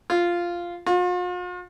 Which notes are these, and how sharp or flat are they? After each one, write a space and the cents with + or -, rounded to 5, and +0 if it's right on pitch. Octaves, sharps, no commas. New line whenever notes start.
F4 -5
F4 +45